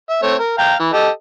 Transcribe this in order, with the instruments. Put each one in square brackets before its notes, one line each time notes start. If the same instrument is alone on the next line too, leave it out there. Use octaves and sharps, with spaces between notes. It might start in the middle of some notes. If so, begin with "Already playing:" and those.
[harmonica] E5
A3 C4 C#5
A#4
F5 G5 A#5
E3
G4 A4 D#5